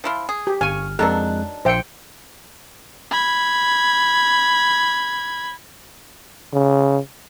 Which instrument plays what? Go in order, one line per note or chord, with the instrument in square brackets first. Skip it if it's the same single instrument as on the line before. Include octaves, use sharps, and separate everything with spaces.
[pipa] F3 E4 F4
G#4
[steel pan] G4
[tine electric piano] G1 F6 [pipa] F5 C#6 [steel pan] G#5
[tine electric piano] F2 G#3 F#6 [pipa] D#3 F#3 D4 [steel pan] A4
[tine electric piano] A#1 C#7 [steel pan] C5 E5 G5
[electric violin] B5 G#6
[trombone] C#3